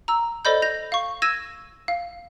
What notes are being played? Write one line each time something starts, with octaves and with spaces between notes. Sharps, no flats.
A#5 E6
A4 C5 D5 D#5 B5 G6
G6 A#6 F7
F5 C#6
E6 G#6 A#6 D#7 E7
F5